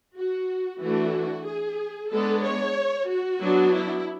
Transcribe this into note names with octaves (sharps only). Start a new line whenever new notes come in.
F#4
E3 A3 D4 F#4
G#4
G#3 B3 D4 A4
C#5
F#4
F#3 B3 D4
E4